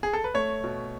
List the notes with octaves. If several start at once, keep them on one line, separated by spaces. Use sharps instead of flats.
G#4
A4
B4
A3 C#5
B2